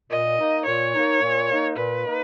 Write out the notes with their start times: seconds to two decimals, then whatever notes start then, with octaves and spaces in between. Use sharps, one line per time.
0.10 A#2 D#5
0.38 A#3 D#4
0.66 A#2 C#5
0.94 A#3 D#4
1.21 A#2
1.50 A#3 D#4
1.77 A#2 B4
2.05 A#3 D#4